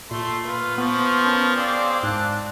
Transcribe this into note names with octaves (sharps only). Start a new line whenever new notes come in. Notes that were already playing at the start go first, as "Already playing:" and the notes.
A#2 A3 C6
F4 B4
F3 B3 C#6
C#4 A#4 A5
C4 G#4 D5 F5 D6
G#2 A5 E6 F#6